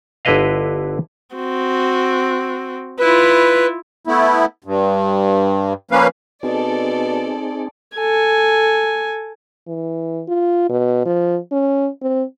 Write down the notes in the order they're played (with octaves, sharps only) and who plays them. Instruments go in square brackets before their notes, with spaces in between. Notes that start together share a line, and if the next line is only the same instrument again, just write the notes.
[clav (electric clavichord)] G1 D3 E4 B4 D#5 F5
[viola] C4 F#4
[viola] E4 F4 [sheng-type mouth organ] B4
[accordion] A3 B3 E4
G2
F3 A#3 C#4 B4 F5
[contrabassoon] B2 [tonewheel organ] C4 D#4 G#4 [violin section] A4 D5
[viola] A4 G#5
[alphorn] E3
F4
B2
F3
C#4
C4